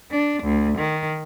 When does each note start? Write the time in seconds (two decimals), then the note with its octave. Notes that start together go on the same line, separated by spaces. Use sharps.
0.11 D4
0.43 D2
0.78 D#3